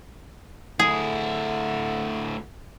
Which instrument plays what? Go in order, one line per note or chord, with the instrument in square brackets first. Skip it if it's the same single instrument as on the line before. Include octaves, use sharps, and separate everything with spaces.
[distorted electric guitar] D2 E4 [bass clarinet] D3 [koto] G#4